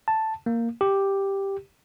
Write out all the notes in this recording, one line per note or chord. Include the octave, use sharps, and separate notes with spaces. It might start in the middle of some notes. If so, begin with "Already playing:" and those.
A5
A#3
G4